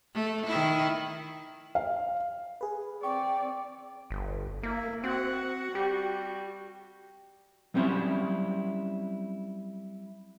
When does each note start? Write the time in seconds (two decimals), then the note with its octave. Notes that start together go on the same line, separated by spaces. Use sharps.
0.14 A3
0.46 D#3 E4
1.75 F5
2.61 G#4 B4
3.03 C4 D5 G5 C#6
4.11 G1
4.63 A#3 E4
5.04 C4 F#4 F#5
5.75 G3 G4
7.74 F#3 G3 C4 C#4 E4